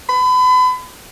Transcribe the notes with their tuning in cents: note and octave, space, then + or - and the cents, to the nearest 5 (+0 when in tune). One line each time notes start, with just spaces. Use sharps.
B5 +35